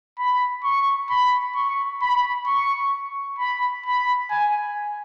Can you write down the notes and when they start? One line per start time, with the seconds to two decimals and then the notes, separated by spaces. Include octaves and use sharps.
0.18 B5
0.64 C#6
1.10 B5
1.56 C#6
2.02 B5
2.47 C#6
3.39 B5
3.85 B5
4.30 G#5